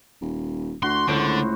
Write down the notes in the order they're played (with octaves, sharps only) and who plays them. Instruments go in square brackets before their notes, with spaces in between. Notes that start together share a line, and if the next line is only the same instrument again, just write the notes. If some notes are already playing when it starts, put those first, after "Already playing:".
[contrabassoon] D#1
[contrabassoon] D2 [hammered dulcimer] F#4 [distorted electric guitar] C6
[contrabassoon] C#2 [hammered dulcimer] A2 C5 [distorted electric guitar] D3